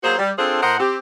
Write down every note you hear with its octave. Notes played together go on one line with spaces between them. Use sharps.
F#3 A#3 F#4 G#4 C5
G3
C4 D4 F4 G#4 A4 C5
A2 A#4 C5 D#5 F#5
C4 G4